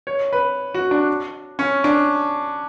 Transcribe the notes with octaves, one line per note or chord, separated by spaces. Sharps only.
C#5
B4
F#4
D4
C#4
D4